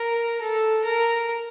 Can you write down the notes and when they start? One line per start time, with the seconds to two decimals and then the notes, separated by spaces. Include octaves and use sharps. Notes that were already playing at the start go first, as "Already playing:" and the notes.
Already playing: A#4
0.42 A4
0.84 A#4